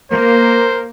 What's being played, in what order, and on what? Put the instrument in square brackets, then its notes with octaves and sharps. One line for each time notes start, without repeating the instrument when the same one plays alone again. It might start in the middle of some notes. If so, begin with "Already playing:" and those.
[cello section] A#3 [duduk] A#4 [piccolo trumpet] C5